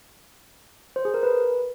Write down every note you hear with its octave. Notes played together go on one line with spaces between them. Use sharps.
C5
G#4
A#4
B4